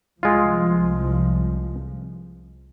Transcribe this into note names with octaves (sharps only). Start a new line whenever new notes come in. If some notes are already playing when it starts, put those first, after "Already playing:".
C2 F3 G#3 F4